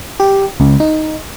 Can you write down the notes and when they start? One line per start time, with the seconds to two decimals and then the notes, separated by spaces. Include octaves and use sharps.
0.20 G4
0.60 C#2
0.80 D#4